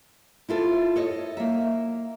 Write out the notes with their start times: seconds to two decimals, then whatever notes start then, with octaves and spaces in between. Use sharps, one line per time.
0.49 E4 F4 A4 C5
0.96 A4 C#5 D#5
1.37 A#3 E5